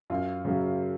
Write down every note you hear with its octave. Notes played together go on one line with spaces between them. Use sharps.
F#2 F4
C#3 F#3